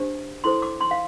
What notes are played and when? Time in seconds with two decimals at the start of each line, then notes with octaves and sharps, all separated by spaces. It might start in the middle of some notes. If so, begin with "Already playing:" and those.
Already playing: D4 G4 C5
0.44 E4 A4 C5 C6
0.62 D6
0.81 C6
0.91 F5